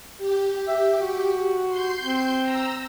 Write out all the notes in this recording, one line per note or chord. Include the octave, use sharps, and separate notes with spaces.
G4
E5
F#4
C6 G6
C4
A#5 E6